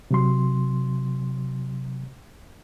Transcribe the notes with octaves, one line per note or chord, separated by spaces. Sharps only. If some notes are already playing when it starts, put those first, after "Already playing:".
C3 F#3 C6